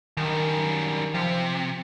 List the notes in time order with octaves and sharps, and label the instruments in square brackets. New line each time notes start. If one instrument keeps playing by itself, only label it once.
[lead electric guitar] F#2 G3 [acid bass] D#3
[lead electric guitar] C3 [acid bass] F3